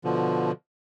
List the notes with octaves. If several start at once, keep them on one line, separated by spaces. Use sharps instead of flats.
B2 D3 F3